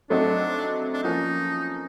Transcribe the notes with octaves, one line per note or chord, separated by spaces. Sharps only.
F#3 A3 C4 D4 D#4
D4
F3 A#3 C#4 D#4